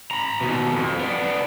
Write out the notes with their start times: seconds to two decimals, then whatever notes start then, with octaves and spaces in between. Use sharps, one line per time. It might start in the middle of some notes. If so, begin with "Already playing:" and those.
0.11 A#5 B5
0.41 D#2 B2
0.75 F2
0.99 B3 D4